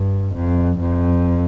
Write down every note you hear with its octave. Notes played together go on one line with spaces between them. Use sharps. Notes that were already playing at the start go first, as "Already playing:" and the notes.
Already playing: G2
F2
F2